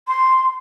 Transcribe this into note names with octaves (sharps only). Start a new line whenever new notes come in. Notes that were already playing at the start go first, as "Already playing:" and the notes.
C6